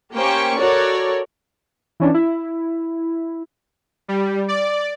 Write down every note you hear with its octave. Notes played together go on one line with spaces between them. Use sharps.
A#3 C#4 G4 C5 G5 C#6
F#4 A4 A#4 C#5 D5
E3 C#4 D4
E4
G3
D5